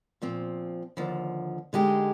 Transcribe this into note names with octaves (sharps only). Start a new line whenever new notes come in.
A#2 F3 C4
D#2 D3 F3
D3 G#3 D#4 G4